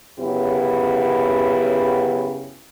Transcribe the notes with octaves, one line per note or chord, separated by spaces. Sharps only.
F#2 C#3 B3 E4 G4 C#5